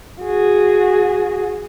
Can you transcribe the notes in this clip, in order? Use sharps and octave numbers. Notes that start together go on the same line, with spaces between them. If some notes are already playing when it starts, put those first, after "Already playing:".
F#4 G#4